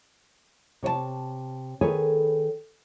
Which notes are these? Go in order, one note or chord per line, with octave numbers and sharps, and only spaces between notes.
C3 C#5 D5 A5
D#3 G#4 A4 B4 C#5 G#5